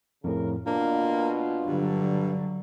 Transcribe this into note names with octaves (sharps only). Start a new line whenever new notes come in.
F2 A2 C#3 A#4
B2 A#3 D4 F4
G2 D3 F#3